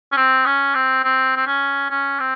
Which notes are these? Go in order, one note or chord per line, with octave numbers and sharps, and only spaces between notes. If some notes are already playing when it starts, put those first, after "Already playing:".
C#4
C4
C#4
C4
C4
C4
C#4
C#4
C4